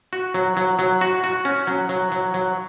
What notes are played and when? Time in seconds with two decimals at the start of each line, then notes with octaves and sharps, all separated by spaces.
0.13 F#4
0.34 F#3
0.57 F#3
0.79 F#3
1.01 F#4
1.24 F#4
1.45 C#4
1.67 F#3
1.89 F#3
2.12 F#3
2.34 F#3